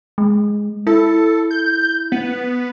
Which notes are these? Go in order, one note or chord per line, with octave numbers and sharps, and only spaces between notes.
G#3
E4 A4
G6
B3